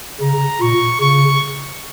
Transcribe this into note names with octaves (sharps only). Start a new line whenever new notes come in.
C#3 A#5
A#2 C#6
C#3 C#6